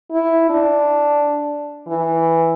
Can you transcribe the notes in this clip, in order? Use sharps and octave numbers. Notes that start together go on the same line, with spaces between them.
E4
D4
E3